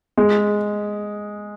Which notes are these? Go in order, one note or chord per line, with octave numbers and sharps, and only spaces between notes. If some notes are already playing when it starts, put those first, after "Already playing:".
G#3